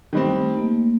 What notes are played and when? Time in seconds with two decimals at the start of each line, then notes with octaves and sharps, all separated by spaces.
0.13 D#3 G3 A3 C4
0.41 A3
0.57 A#3
0.69 A3